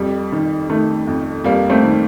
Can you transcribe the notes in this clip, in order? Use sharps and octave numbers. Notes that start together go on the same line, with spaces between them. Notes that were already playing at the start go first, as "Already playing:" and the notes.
Already playing: F2 G3
D#3
D#3 A3
F2
F2 G3 A#3
A3 C4
D#3